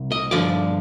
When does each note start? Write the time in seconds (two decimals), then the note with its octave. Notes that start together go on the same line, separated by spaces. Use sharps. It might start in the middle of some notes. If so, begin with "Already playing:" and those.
Already playing: C2
0.12 D#5
0.31 G2 D3 F3 D5